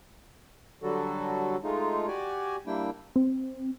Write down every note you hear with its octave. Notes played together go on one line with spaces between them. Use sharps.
D3 F#3 G3 F#4 A4
G#3 A3 D#4 F4
F#4 G4 D5 G#5
G3 A#3 D4 E4 G5
C4